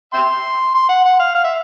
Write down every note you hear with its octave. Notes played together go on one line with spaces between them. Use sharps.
E5 G5 C6
C6
F#5
F#5
F5
F5
E5